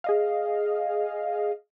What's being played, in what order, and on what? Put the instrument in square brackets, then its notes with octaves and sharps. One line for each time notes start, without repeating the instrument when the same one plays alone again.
[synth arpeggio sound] G#4 D#5 F5